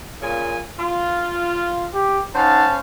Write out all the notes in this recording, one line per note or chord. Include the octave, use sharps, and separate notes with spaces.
A#2 C#3 G#5
F4
G4
C#4 D#4 C5 F5 F#5 A5